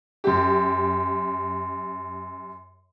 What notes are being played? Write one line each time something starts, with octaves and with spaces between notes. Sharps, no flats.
F#2 G4